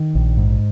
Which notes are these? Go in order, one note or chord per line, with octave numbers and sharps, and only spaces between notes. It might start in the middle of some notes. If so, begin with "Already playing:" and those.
Already playing: D#3
A#1
G#2